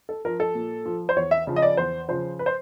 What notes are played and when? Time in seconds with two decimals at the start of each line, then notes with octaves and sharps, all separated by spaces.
0.09 A4
0.25 F3 A#4
0.40 A4
0.55 A#2
0.85 F3
1.09 C5
1.16 E2 C#5
1.31 E5
1.47 C#3 F3
1.56 D#5
1.62 D5
1.77 E2 C5
2.08 C#3 F3 C5
2.39 B4
2.46 C5